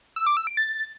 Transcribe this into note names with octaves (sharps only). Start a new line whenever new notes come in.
E6
D6
E6
D7
A6